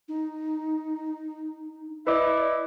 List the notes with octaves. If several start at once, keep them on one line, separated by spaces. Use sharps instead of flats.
D#4
E4 B4 D5 D#5 D6